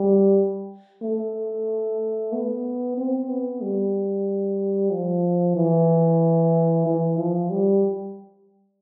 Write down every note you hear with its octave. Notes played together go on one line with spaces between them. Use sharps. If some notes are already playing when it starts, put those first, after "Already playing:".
Already playing: G3
A3
B3
C4
B3
G3
F3
E3
E3
F3
G3